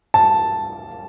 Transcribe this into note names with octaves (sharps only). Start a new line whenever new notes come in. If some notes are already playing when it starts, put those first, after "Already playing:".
A5